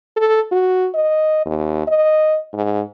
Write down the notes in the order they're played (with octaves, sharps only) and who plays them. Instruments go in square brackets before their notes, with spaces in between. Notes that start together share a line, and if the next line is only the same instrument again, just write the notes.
[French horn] A4
F#4
D#5
D#2
D#5
G#2